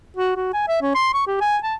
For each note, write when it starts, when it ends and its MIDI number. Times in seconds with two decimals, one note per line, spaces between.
0.17 0.34 66
0.36 0.49 66
0.53 0.66 80
0.68 0.77 76
0.82 0.94 61
0.95 1.11 84
1.13 1.23 85
1.27 1.40 67
1.41 1.57 80
1.63 1.75 81